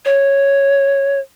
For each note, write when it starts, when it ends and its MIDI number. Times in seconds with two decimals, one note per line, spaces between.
0.05 1.19 73